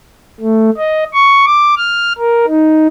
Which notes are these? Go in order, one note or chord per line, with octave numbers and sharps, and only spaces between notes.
A3
D#5
C#6
D6
F6
A#4
D#4